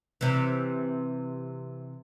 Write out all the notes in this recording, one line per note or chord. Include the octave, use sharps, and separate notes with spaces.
C3 E3